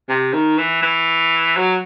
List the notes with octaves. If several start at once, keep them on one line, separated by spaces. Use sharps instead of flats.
C3
D#3
E3
E3
F#3